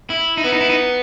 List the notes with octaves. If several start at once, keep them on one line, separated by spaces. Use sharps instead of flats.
E4
D#4
B3 E4
D#4
E4
D#4